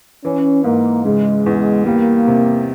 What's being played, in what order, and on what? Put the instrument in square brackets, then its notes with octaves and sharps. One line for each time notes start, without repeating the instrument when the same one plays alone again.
[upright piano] E3 [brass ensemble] C#4
[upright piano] G#2 [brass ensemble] A#3
[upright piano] C#3 [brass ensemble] G#3
[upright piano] E2
[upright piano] G3 [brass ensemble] A#3
[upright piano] C3